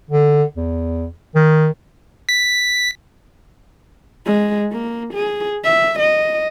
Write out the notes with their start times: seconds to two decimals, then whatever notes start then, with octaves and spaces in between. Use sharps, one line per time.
0.10 D3
0.56 E2
1.35 D#3
2.29 B6
4.26 G#3
4.72 A#3
5.14 G#4
5.64 E5
5.99 D#5